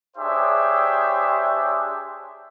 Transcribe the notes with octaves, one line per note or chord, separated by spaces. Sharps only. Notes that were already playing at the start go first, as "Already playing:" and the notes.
D4 G4 G#4 C5 C#5 E5